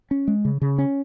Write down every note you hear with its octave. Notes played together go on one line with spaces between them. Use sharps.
C#4
G#3
C#3
C#3
C#4